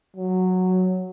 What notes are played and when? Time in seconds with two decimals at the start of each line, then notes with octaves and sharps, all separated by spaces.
0.16 F#3